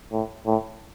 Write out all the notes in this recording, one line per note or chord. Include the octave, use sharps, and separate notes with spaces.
A2
A2